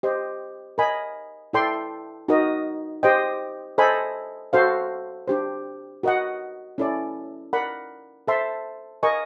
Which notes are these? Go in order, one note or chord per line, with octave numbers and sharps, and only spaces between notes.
G4 C5 D#5
A#4 D#5 G#5 B5
E4 A4 D5 G5 C6
D#4 F#4 A#4 D#5
G4 C5 D#5 G5
A4 C5 D#5 G#5 B5
F#4 A4 C5 F5
D4 G4 C5
F#4 A#4 D#5 F#5
C#4 E4 A4 D5
A#4 D5 F#5 B5
A4 C5 E5 A5 C6
A#4 D#5 G#5 C#6